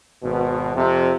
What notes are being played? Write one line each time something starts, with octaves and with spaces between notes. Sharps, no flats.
G#1 B2
F2 C3